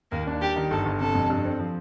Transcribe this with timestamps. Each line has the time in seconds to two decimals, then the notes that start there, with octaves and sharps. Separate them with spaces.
0.11 D#2 A#3
0.27 D4
0.41 G3 G4
0.56 D#3
0.71 G1 A4
0.86 G1
1.00 C3 A4
1.15 F2
1.30 G2
1.45 C4
1.60 F3